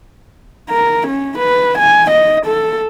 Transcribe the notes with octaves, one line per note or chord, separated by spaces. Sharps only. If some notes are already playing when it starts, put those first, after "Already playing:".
A#4
C#4
B4
G#5
D#5
A4